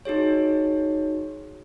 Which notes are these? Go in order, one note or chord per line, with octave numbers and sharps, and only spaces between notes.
D#4 F#4 G#4 C#5